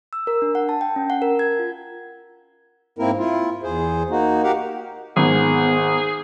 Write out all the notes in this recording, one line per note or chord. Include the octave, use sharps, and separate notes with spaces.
E6
A#4
D4
F#5
A5
G5
C#4
F#5
A#4
G#6
F4
G#2 A#3 C4 E4 A#4
E4 F4
E2 G#4 C5
A#3 D#4 F#4
F#4 G4 A#4 F5 F#5
G#1 B3 G#4